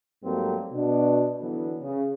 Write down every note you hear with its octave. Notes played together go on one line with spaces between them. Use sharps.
G#2 F#3 G3 A3 A#3 C4
B2 D4
D3 E3 F#3 B3
C#3